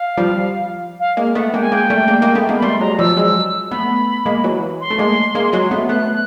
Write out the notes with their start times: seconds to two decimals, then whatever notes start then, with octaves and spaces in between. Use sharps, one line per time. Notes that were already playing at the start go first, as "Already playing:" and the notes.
Already playing: F5
0.17 F3 G3
1.00 F5
1.17 G#3 A#3
1.35 A3 B3 F#5
1.53 G#3 A#3 G5
1.62 G#5
1.72 G#3 A#3 G5
1.90 G3 A3
2.08 G#3 A#3
2.22 G#3 A#3
2.35 A3 B3
2.49 G#3 A#3
2.58 B5
2.62 G3 A3 C6
2.80 F#3 G#3 A#5
2.99 F3 G3 E6
3.17 F#3 G#3 E6
3.71 A3 B3 B5
4.26 G#3 A#3
4.44 E3 F#3
4.81 C6
4.91 A3
4.98 G#3 A#3
5.35 G#3 A#3
5.53 F#3 G#3
5.71 A3 B3
5.89 A3 B3 F#6